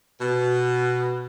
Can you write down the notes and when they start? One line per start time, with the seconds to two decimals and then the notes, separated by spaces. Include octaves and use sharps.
0.19 B2